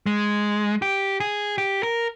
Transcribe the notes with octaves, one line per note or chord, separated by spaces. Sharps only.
G#3
G4
G#4
G4
A#4